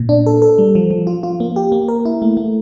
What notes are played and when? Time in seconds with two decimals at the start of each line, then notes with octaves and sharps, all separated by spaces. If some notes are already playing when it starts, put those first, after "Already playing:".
Already playing: A#2
0.09 D4
0.26 A4
0.42 A4
0.58 G3
0.75 F3
0.91 F3
1.07 F4
1.23 F4
1.40 A#3
1.56 G4
1.72 A#3
1.88 A#4
2.05 E4
2.22 A3
2.37 A3